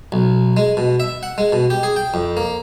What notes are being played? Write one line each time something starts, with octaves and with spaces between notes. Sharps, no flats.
B1
G#3
B2
E5
F#5
G#3
B2
G4
G#4
G5
F2
A#3